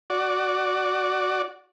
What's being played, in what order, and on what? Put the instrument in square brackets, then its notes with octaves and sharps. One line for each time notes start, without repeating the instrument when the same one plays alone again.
[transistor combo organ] F#4 D5